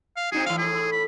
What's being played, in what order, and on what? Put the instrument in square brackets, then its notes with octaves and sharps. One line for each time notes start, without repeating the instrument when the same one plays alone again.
[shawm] F5
[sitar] C4 D#4 F#4 [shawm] G#4
[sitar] A2 E3 [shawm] F5
[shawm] G#4
B5